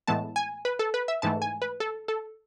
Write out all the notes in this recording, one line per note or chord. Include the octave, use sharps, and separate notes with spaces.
A2 E3 G#3 B3 A5
G#5
B4
A4
B4
E5
G#2 E3 A3 A5
G#5
B4
A4
A4